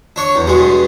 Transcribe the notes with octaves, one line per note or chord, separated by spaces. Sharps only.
D4 C#5 C#6
E2
G2 B2 G#3